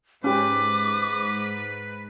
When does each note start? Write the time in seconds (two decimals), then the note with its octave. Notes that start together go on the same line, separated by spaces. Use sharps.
0.24 G#2 C#4 G4 B4 D6